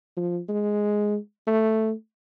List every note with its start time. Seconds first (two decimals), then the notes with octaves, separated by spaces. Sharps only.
0.17 F3
0.48 G#3
1.47 A3